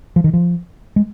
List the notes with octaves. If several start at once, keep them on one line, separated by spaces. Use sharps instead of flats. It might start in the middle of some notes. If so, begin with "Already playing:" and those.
F3
D#3
F3
G#3